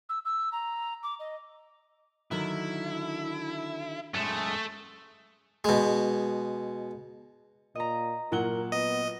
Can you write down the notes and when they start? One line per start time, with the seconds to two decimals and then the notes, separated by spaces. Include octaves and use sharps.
0.09 E6
0.25 E6
0.52 A#5
1.03 D6
1.20 D#5
2.31 D3 D#3 F#3 E4
4.14 F#2 G#3 A3
5.64 B2 G#3
7.75 A#2 D#5 A#5
8.32 A#2 F#3 A#4 F#5 G7
8.72 B3 D#5